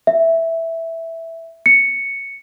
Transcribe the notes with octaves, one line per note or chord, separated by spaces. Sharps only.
E5
C#7